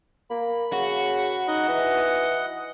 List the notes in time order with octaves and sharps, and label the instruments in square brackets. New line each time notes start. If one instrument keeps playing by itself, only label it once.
[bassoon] A#3 [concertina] B5
[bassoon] C#3 [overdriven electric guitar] F#4
[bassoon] D#4 [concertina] D#5 F#5
[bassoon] E3